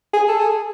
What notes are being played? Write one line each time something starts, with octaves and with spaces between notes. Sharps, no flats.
G#4
A4
G#4